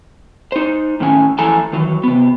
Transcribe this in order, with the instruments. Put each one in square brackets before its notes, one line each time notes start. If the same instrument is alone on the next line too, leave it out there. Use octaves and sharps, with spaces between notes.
[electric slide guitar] D#4 C5
A2 D#3 C#4 F#5 G#5
F2 E3 A3 A4 G#5 A#5
D#3 E3 F#3
C3 B3